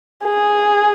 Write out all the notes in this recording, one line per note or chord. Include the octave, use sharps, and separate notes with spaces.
G#4